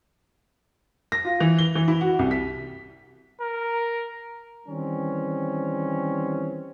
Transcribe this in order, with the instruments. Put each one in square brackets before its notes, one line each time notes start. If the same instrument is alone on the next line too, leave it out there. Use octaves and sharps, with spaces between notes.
[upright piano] A#6
F4
E3
G7
E3
E4
F#4
C2
B6
[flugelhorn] A#4
[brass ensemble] D#3 E3 G3 C4 C#4